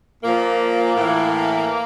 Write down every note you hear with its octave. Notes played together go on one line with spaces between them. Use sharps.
A#2 F3 A#3
A2 E3